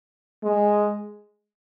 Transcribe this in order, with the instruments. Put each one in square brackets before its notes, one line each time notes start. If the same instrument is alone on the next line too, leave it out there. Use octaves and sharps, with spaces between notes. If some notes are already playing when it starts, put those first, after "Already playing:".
[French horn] G#3